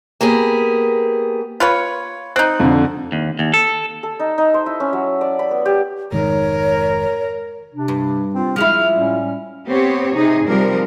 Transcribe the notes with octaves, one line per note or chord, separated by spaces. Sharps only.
A#3 B3 G4 G#4
F4 B4 C#5
C4 D#4 F#6
F2 D3
D#2
D#2
A4
A4
D#4
D#4
C5
E4
C#4
F#3
D5
B5
B3
G4
F1 G#2 D#3 A#4 C#5
C3 D4
G2
C4 F4
F3 G#3 E4 F6
A2 G3 C#4
B3 C4 G4 C#5
C3 D#4 G#4
C3 F3 G3 A#4